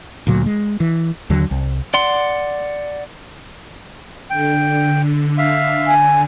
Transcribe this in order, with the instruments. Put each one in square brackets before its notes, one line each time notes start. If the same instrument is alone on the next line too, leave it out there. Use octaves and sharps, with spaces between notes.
[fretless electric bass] D2 A#2 F#3
G#3
E3
D#2 D3 F#3
C2
[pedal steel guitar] D5 F#5 C6
[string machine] D3 [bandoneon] G5
[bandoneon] E5 F5
[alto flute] G#5